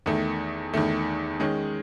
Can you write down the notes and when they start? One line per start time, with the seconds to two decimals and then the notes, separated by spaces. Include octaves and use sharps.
0.06 E2 D#3 A3
0.74 E2 D#3 A3
1.40 D#3 G#3 C#4